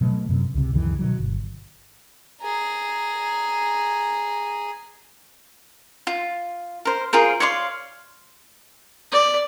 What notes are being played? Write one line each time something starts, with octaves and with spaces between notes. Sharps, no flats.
B2 F#3 G#3 A3
F#2 C3
C#2 C3
C#2 F#2 D#3 E3
B2 D#3 F#3
G1
G#4 A#5
F4
A#4 C5
F4 G#4 A#4 C5
C#5 D5 F5 C6
D5